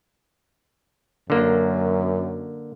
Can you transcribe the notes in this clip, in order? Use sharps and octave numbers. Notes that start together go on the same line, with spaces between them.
F#2 D3 A#3